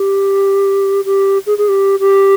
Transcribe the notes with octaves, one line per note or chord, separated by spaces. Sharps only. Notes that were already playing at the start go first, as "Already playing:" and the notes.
Already playing: G4
G4
G#4
G#4
G4
G4